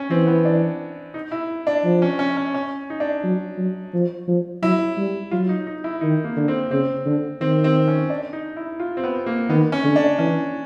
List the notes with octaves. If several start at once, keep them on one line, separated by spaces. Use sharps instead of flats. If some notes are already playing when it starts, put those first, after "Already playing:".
Already playing: C#4
E3 C4
B3
D4
D#4
E4
D4
F3
C#4
C#4
C#4
C#4
D#4
D4
F#3
F#3
F3
F3
F#3 E4
G3
F#3 F4
D#4
D#4
E4
D#3 D#4
A#3
D3
C4
C#3 C4
D3
D#3 C4
C4
C#4
D4
D#4
E4
F4
C4
B3
A#3
D#3 B3
C#4
D3
D4
E3 C#4